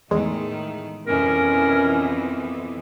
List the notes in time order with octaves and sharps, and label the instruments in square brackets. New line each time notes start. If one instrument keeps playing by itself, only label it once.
[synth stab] E2 G#3 [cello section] A2 D#3 A3
[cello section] F2 B2 E3 [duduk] C#4 [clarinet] A#4